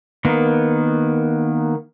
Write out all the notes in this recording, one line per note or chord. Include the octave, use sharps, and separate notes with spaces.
D#3 A#3 B3